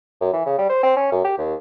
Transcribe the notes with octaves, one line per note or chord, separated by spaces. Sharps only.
F#2
E3
C#3
G3
C5
C4
C#4
F#2
G4
D#2